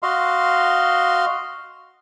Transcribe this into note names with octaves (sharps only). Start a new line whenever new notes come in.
F#4 D#5 F5 C6